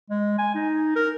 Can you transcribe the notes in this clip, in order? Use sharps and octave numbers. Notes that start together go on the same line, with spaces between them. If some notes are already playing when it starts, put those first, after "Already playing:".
G#3
G#5
D#4
A#4